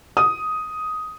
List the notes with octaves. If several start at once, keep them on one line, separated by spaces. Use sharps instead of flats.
D#6